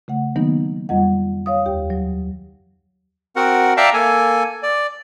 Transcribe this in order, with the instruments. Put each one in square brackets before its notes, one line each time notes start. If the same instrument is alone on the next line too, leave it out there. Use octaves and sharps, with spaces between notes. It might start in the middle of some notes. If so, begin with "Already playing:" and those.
[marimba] C#3 A3 F#5
D#3 F#3 A#3 B3 D#4
F2 G3 D#5 F#5
C#5 F5 D#6
D#2 G4 G5
F#3
[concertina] C4 F#4 A#4 F#5
D5 E5 F5 G5 A5 A#5
A#3 A4 G#5
D5